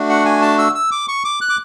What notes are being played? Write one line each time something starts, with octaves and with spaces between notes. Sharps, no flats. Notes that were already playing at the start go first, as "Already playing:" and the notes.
Already playing: A3 D4 F#4
F#5
G#5
A5
E6
E6
D6
C#6
D6
F#6
D6